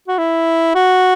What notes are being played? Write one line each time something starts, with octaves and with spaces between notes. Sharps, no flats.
F#4
E4
F#4